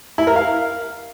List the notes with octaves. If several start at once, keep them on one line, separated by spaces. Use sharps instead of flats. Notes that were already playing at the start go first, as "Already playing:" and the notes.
E4
A#4
F5